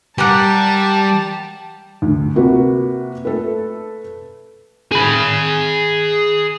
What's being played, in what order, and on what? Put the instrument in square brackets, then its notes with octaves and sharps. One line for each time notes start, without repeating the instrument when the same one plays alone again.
[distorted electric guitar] G3 [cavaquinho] G4 A#4 F#5 [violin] A5
[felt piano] D2
C3 A#3 F#4 B4
A3 A4 B4
[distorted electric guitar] G#4 B5